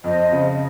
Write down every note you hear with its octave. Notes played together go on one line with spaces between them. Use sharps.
F2 C5 D#5
C#3